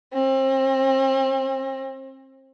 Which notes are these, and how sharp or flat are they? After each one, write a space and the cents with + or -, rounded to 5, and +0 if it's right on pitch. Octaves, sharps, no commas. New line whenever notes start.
C4 +35